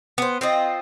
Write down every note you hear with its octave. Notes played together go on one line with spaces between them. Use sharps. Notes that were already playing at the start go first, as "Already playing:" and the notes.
B3 C5
C4 F4 D#5